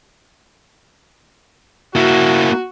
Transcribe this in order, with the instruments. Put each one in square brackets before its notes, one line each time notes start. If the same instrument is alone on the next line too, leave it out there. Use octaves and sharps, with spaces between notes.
[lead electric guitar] A#3 E4 [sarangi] F#4